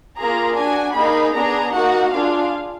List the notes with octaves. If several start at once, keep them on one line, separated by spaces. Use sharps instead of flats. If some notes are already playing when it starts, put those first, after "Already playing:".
A#3 F4 G#4 A#5
D4 F#4 G#5
A#3 D#4 G#4 B5
B3 D4 G#4 A#5
A#3 D#4 F#4 F#5
D4 F4 G#4 F5